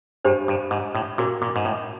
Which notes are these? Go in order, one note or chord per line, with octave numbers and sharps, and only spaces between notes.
G2 D4 G4 C5
G2
G#2
A2
A#2 C#4 F#4 A#4
A#2
G#2
A2